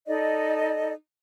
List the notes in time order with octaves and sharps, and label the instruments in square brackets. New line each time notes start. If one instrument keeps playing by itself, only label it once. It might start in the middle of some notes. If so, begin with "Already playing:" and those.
[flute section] D#4 A4 D5 D#5